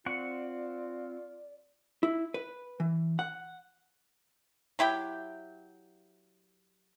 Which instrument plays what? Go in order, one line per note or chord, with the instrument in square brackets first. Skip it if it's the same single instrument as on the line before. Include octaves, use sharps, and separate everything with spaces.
[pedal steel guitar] C4 F#5 C#6 [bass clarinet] F4 [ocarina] D5
[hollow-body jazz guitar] E4
B4
E3
F#5
[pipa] F#3 E4 G4 G5